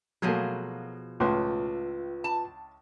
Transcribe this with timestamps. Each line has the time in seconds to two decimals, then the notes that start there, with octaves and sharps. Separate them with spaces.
0.22 B2 F3 F#3 A3 A#3 G#4
1.20 C#2 A2 F4 B4 C6
2.24 A5